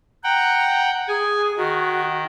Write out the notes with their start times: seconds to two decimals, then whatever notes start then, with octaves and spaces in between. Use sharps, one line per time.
0.24 F#5 G5 A#5
1.08 G#4 G#5
1.57 D#3 F#4